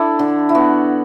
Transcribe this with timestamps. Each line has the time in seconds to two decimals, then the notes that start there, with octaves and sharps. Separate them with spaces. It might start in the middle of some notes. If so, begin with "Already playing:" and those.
Already playing: D4 E4 A4
0.19 D3
0.49 E4
0.55 B3 F#4